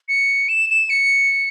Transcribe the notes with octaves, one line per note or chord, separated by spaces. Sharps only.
C#7
E7
E7
C#7